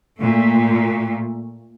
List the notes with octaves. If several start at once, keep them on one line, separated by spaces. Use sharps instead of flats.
A#2 A3